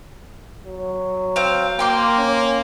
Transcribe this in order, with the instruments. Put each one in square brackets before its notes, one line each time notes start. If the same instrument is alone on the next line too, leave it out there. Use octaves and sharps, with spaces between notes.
[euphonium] F#3
[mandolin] C4 F5
[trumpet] A#3 [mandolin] G5 C6 D6
[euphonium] C#4